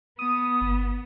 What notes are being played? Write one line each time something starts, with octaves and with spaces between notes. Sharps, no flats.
B3 D#6
G1